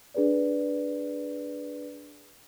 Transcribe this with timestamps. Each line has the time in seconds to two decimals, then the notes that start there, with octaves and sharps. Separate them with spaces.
0.14 D4 G#4 B4 D5